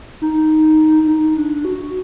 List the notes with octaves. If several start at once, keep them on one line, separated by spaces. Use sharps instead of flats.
D#4
D#4
D4
F#4